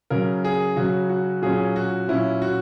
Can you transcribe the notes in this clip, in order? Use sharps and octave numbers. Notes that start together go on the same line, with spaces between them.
C#3 F#3 C#4 A#4
G#4
C#3 F#3 C#4 F#4
F#4
A#2 F#3 C#4 G#4
F#4
A#2 F#3 C#4 E4
F#4